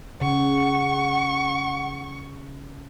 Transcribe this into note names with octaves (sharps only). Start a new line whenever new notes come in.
C#3 F#5 C#6